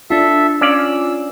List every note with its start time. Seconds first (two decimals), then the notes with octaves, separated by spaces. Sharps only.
0.10 D4 F4 A4 E5
0.61 C#4 D5 F5 E6